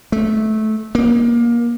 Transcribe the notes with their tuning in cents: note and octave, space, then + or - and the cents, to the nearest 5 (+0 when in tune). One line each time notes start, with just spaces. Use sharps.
A3 -20
A#3 +20